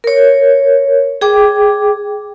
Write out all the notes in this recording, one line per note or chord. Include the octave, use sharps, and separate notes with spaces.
A#4 C#5
G#4 G5 D6